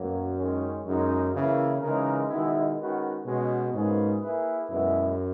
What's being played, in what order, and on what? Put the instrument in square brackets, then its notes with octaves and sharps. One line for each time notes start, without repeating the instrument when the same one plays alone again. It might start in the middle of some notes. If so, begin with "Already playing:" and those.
Already playing: [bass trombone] F#2 [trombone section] B2 F#3 A#3
[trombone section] D#3 G#3 C#4
[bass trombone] F#2 [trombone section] C#3 G#3 D#4
[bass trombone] C#3 [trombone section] E3 A#3 E4
[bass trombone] C#3 [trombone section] E3 G#3 D#4 A#4
[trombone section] B2 G#3 B3 E4 [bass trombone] D#3
[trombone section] D#3 G#3 C#4 F#4 B4
[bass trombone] B2 [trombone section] G#3 C#4 F#4
[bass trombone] G#2 [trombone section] B2 A#3 C#4 G#4 B4
[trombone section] A#3 E4 G#4 B4
[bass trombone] F#2 [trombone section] B2 G#3 B3 E4